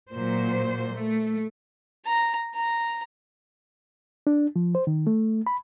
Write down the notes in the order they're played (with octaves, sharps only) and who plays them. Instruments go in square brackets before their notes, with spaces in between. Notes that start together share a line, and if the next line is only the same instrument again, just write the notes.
[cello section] A#2 F#3 C5
A3
[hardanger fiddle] A#5
A#5
[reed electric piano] D4
F3
C5
D#3
A3
B5